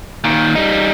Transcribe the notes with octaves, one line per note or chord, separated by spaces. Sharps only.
A#2 D#3
G3 D#4